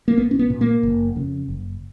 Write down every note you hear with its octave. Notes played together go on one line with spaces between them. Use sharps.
A#3
A#1 B3
C#4
B3
A#2
A#3
F#1
F2 C#3
F#1